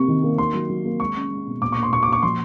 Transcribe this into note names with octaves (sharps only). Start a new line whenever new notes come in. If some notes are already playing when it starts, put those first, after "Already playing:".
Already playing: C3 A#3 C#6
D#3
A#3
D#3 C6
F#3
F#3
A#3
G#3 C#6
C#4
G#3
B2
A#2 D6
A#3 C#6
C6
A#2 C#6
D6
A#2 C#6
F3 C6